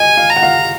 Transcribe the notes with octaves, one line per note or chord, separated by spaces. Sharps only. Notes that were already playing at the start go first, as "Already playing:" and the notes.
Already playing: D#5 G#5
F5
A#5
F#5
F5